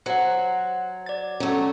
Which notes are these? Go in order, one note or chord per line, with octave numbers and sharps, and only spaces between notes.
F#3 C5 F#5
D5 A6
F#3 A3 C#4